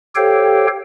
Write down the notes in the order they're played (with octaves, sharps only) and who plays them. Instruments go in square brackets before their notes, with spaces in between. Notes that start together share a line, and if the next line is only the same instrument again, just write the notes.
[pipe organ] G4 A4 C5 C#5 F5 G5